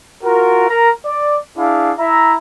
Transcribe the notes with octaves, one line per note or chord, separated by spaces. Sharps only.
F4 F#4 A#4
A#4 A#5
D5
D4 E4 G#4 F5
E4 E5 A#5